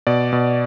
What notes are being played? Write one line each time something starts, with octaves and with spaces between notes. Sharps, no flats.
B2 D5
B2